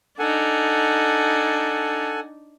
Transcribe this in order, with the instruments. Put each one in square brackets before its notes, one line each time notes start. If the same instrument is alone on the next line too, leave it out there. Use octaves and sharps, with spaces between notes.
[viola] D4 D#4 [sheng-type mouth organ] A4 F#5 G#5